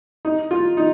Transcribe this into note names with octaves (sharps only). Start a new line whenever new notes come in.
D#4
F4
D#4